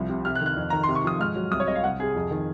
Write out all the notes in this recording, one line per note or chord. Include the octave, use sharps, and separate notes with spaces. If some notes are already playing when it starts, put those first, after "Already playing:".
Already playing: C2 F3
C3
C3 F6
F#6
D#3
F#6
F2
D#3 A#5
C6
C3
C#6
F3 D#6
G#2 F6
F#3
C2 D#6
C#5
C3 D#5
F5
C2 F#5
C3 G#4
F2
D#3